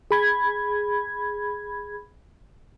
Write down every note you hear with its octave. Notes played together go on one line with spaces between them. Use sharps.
G#4 B5 G#6